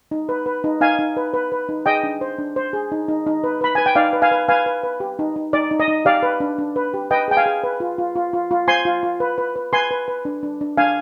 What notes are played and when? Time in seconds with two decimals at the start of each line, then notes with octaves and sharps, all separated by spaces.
0.11 D#4
0.29 B4
0.46 B4
0.64 D#4
0.81 D#4 F5 G#5
0.99 D#4
1.17 B4
1.34 B4
1.52 B4
1.69 D#4
1.86 G#4 D#5 G5
2.03 D4
2.21 C5
2.38 D4
2.56 C5
2.73 G#4
2.92 D#4
3.08 D#4
3.26 D#4
3.44 B4
3.61 B4 B5
3.75 B4 G#5
3.86 G5
3.96 D#4 D5 F5
4.13 B4
4.22 F5 G#5
4.31 B4
4.49 B4 F5 G#5
4.66 B4
4.83 B4
5.00 G4
5.19 D#4
5.36 D#4
5.53 D#4 D5
5.71 D#4
5.80 D#5
5.88 D#4
6.05 G4 D5 F5
6.23 B4
6.40 D4
6.59 D4
6.76 B4
6.94 G4
7.11 B4 D#5 G5
7.28 G#4 G5
7.37 F5 G#5
7.46 G#4
7.64 B4
7.80 F4
7.98 F4
8.16 F4
8.33 F4
8.51 F4
8.68 C5 G#5 C6
8.85 F4
9.03 F4
9.20 B4
9.38 B4
9.56 B4
9.73 B4 G#5 C6
9.91 B4
10.08 B4
10.25 D4
10.43 D4
10.61 D4
10.78 D4 F5 G#5